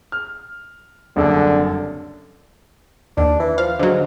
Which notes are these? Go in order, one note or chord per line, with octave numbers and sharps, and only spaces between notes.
F6
F#1 C2 D3
D#2 D4
E3
F3 F5
G#2 D3 F#3